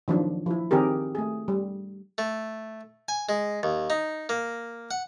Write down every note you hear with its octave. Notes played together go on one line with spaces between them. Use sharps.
D#3 F3 F#3 D4
F3 E4
D#3 C4 G4 G#4 A#4
A3 G#4
G3
A3
G#5
G#3
D#2
D#4
A#3
F#5